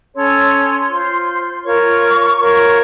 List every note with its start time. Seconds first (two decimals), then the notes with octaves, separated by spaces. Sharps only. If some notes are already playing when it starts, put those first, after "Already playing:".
0.14 C#4 A4 C#5 C6
0.89 F4 C5
1.63 F4 A#4 C#5 C#6
2.39 F4 A#4 C#5